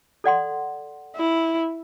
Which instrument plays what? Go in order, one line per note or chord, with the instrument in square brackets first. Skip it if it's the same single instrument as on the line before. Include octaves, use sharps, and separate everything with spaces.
[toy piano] A4 D5 F#5 C6
[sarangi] E4